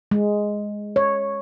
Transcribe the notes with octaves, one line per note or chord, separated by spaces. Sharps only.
G#3
C#5